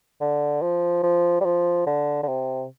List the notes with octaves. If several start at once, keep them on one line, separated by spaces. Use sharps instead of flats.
D3
F3
F3
G3
F3
D3
D3
C3